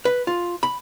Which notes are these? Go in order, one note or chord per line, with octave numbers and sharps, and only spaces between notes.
B4
F4
B5